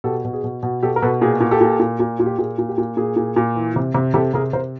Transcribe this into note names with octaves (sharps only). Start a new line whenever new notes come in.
B2 G4 A4
B2
G#4
B2
B2
B2 G4 A4
A#4
B2 A4 B4
A#2 G#4
A#2
G4 A4
A#2
A#2
A#2
A#2
G4
A#2 G#4
A#2
G4
A#2
A#2 G#4
A#2
A#2
E3
C3
C3
C3 G4 A4
C3 G#4 A#4
C3 A#4 C5